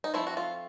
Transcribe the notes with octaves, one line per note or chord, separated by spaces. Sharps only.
D#4
F3 A3 C4 E4
F#4
F4